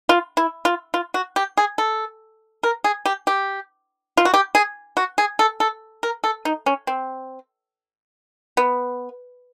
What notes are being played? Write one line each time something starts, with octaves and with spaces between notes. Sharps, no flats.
F4
E4
F4
F4
F#4
G4
G#4
A4
A#4
G#4
G4
G4
F4
F#4
G4
G#4
F#4
G#4
A4
A4
A#4
A4
D#4
C#4
C4
B3